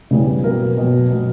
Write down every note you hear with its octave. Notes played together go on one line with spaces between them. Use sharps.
C#3 E3 G3 B3
B2 F#3 A#3 B3 A#4
B2 F#3 B3
B2 F#3 B3